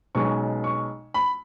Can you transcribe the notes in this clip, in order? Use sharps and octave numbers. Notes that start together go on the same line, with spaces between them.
B1 B2 G#3 C#4 C#6
C#6
B5